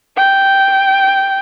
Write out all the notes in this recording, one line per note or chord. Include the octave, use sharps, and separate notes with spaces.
G5